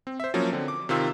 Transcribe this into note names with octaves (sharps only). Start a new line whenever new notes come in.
C4
C5 E5
F3 F#3 A#3 C#4 F#4
D3 C4
D6
C3 D#3 F4 E6